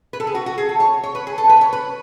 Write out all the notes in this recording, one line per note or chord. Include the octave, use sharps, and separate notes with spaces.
B4
A4
G#4
F#4
F#4
G#4
A4
C#5
C#5
B4
G#4
A4
B4
C#5
B4